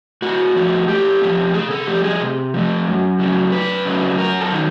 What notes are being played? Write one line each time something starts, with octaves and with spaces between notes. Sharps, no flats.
A2 F#4
F3 A3
A2 G4
F3 A3
C3 G#4
A4
F3 A3 G4
G#4
C3
F3 A3
F#2
C#3 F#3 A3
F#2 B4
C#3 F#3 A3
F#2 A#4
A4
D#3 F#3